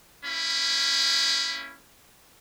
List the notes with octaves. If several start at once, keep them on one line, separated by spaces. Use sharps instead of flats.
A#3 C#4 E4 B5